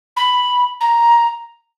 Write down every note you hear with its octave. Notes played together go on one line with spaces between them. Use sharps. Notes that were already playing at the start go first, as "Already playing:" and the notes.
B5
A#5